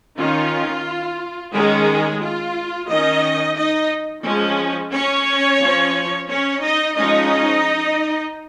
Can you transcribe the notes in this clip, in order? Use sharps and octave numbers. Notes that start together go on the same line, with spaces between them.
D#3 C#4 F4
D#3 G#3 C#4 G#4
F4
D#3 C#4 D#4 D#5
D#4 D#5
F3 G#3 C#4
C#4 C#5
F3 C#4
C#4 C#5
D#4 D#5
F3 G#3 C#4 D#4 D#5